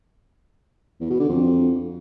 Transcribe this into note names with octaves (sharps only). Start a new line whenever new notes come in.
E2
B2
D3
F2